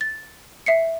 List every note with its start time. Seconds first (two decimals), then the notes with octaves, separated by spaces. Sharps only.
0.01 A6
0.66 E5 C7 C#7